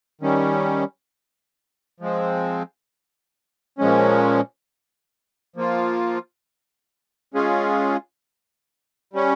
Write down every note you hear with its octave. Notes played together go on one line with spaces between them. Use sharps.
D#3 G3 C#4
F3 G#3 C4
A#2 F3 G#3 C#4
F3 A#3 F4
G#3 C#4 F4 G#4
G3 C#4